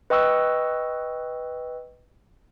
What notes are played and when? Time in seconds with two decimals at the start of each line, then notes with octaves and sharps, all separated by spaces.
0.10 B4 D#5 G5 C#6 E6